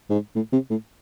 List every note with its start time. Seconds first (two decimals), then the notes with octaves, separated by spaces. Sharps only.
0.10 G#2
0.35 A2
0.53 C3
0.70 A2